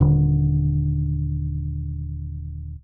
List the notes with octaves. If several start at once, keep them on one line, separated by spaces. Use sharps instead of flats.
D#1 D3